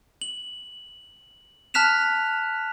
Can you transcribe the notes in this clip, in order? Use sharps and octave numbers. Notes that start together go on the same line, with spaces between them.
F#7
A5 F6 F#6 B6 E7 F7